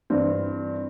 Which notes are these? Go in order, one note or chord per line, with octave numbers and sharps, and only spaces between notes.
G2 E3 C4